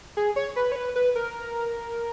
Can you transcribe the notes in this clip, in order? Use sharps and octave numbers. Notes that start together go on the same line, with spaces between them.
G#4
C#5
B4
C#5
B4
B4
A#4